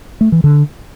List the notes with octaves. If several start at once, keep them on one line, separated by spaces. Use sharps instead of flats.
A3
E3
D3